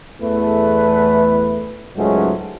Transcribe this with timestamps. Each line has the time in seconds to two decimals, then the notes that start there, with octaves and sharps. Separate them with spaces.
0.20 E2 A3 B4
1.96 C#2 G#2 F#3 G#3 A3 C#4